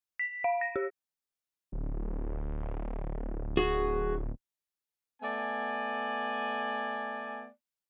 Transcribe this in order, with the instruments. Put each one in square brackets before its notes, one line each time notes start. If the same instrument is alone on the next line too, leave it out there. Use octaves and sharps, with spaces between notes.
[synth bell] B6
F5
A#6
G4
[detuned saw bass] D1
[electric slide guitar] F#4 G#4
[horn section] A3 B3 D5 G#5